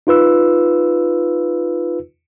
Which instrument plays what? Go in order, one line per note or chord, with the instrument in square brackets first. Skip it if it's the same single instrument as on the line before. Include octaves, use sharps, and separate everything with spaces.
[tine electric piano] D#4 F4 B4 E6